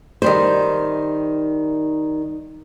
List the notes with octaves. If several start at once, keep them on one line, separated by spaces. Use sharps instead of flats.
D#3 G3 C5